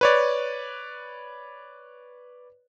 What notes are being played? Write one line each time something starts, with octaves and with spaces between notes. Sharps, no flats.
B4 C#5 D5